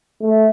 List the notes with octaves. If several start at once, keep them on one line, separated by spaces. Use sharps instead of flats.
A3